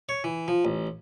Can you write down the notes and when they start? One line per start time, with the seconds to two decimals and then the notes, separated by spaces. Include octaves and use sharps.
0.09 C#5
0.24 E3
0.48 F3
0.65 A1